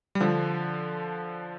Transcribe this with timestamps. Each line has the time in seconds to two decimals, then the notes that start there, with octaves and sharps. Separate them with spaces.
0.15 G3
0.20 D3 F3